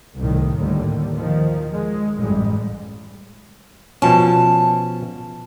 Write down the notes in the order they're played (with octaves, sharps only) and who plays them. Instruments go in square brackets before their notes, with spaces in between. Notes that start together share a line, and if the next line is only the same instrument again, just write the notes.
[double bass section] C2 A2 D#3
D#2 A2 D3 G3
D#3 F3
D#3 G#3
A1 F#2 G3 G#3
[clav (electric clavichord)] B2 F3 C#4 [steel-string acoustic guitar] A5